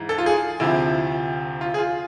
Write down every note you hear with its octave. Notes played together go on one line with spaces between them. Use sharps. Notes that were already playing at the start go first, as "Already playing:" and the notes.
Already playing: G#2 E3
A4
F4
G#4
D2 C3 F3 E4
F4
G#4
F4